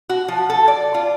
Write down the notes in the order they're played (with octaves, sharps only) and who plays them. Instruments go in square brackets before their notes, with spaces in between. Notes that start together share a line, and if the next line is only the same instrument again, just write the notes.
[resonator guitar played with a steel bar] F#4
F3
A4
D5
F4